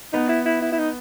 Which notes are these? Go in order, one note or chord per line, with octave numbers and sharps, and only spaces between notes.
B3 D#4
E4
E4
E4
E4
D#4